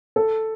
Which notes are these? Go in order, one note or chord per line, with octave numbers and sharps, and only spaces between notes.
A4